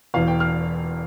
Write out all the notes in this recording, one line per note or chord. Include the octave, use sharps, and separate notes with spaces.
E1 E2 E3 F5
G5
F6